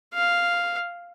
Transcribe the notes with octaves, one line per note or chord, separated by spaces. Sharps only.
F5